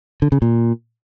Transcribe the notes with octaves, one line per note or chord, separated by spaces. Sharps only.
D3
C#3
A#2